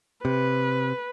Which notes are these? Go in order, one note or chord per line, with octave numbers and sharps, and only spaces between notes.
C3 B4